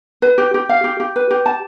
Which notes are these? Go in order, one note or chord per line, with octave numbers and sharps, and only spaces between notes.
B4
G4
G4
F5
G4
G4
B4
G4
A5